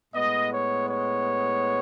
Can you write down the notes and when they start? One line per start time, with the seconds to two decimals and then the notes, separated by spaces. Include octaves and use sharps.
0.14 A2 G#3 B3 D#5
0.52 C#5
0.89 C#5